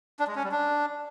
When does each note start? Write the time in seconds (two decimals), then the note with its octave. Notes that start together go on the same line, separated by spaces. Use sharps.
0.19 D4
0.27 G#3
0.36 C#4
0.44 G3
0.52 D4